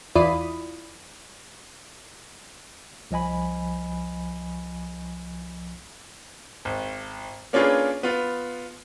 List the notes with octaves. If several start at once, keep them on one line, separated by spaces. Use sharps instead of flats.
E2 E4 F4 D5 B5 D#6
C2 F3 D#5 G#5 B5
G#1
A#3 C#4 D4 F4 G#4 B4
B3 F4